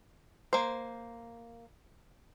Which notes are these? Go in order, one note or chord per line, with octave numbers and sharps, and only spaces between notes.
A#3 C5